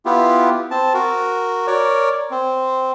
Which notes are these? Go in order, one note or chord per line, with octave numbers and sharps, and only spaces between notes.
B3 E4 F4 G4
C4 A5
F#4 A#4
A#4 C#5 D5
C4